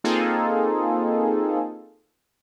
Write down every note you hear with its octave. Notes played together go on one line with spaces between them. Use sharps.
A#3 C4 D#4 F4 G#4 A4